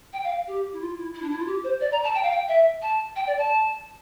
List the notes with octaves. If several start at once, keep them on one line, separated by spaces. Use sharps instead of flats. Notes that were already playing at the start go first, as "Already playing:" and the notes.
G5
F5
G4
E4
F4
E4
E4
D4
E4
F4
G4
C5
D5
A#5
A5
G5
F5
G5
E5
A5
G5
D5
A5